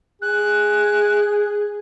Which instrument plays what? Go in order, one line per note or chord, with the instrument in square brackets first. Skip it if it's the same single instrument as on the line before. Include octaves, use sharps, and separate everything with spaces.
[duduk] G#4 [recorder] F#6